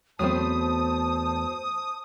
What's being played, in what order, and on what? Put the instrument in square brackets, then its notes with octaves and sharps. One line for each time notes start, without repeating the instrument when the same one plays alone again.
[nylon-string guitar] E2 A3 G5 [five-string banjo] F#3 C4 [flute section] C5 A5 [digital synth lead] D#6